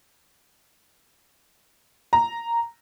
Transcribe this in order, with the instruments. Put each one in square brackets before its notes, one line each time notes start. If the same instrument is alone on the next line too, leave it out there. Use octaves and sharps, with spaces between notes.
[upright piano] A#5